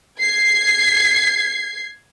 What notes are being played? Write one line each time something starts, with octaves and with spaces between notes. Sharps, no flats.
G#6 C7